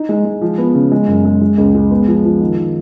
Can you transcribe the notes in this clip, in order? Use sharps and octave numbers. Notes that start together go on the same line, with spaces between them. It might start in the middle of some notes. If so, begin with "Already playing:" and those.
Already playing: D#4
G#3
G#3
F3
B3
C#3
G#3
F#2
G#3
G#3
C#2
G#3
B3
F3
F3
D#3
D#3